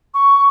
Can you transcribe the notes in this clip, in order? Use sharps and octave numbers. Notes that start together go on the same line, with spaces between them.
C#6